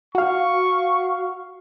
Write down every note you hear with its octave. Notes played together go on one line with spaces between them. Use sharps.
F#4 F5 C#6